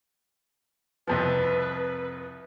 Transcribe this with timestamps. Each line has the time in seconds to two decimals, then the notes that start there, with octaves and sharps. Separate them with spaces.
1.07 C2 F2 F3 B4